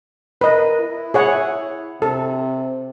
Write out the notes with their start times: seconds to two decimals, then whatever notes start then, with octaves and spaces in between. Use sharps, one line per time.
0.41 A#4 B4 D#5
0.81 E4
1.14 G#4 C#5 F#5
2.02 C3 A4